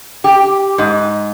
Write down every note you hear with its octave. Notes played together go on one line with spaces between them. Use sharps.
G4
G#2